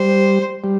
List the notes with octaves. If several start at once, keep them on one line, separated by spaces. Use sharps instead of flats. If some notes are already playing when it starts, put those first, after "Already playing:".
Already playing: G3 C5
G3